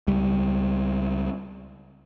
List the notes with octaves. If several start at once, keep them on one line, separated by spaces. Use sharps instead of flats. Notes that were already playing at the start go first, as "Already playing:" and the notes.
C#2 G3